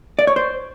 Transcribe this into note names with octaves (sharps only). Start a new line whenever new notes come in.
D5
C#5
C5